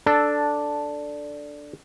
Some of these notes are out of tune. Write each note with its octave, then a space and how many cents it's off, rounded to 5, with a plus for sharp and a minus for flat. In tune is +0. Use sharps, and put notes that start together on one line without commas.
D4 +0 A4 +0